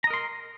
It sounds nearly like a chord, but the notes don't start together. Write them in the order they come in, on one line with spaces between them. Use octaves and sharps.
A#5 D#5 A#4 C6